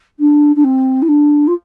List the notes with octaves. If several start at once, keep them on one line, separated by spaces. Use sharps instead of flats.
D4
D4
C4
E4
D4
F4